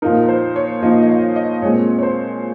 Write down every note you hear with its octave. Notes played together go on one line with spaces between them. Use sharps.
A#2 F3 A#3 D#4 A#4
C5
C#5
A#2 F3 A#3 D#4 D#5
D#5
F5
D#5
A#2 G#3 C4 C#5
C#5
C5